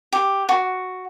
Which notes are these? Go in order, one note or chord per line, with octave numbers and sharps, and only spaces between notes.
G4
F#4